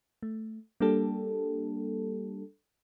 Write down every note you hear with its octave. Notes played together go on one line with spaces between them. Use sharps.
A3
G3 A#3 D4 G4 A4